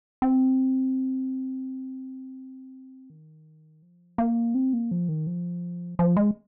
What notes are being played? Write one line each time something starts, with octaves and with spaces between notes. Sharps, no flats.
C4
D#3
F3
A#3
C4
A#3
F3
D#3
F3
F3
G#3